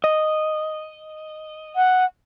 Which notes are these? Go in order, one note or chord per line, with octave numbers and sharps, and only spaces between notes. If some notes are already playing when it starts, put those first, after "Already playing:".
D#5
F#5